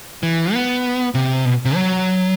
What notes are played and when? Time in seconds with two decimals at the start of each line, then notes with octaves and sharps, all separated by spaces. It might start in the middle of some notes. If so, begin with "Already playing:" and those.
0.23 E3
0.54 B3
1.15 C3
1.45 B2
1.65 C3
1.75 F#3